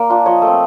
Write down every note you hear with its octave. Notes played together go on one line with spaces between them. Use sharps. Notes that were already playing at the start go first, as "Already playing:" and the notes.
Already playing: A#3 D5
D4 F4
F3 C#5 D#5
A3
C4